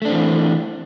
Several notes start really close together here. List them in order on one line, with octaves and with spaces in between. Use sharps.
A3 D4 C4 E3